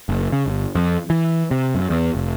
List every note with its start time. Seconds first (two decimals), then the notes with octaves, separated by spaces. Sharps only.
0.09 F#1
0.32 C#3
0.46 G1
0.75 F2
1.10 E3
1.51 C3
1.75 F#2
1.90 E2
2.15 F1